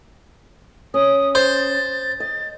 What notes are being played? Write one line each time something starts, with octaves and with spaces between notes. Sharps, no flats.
C#4 D#6
C5 A6
D#5 A6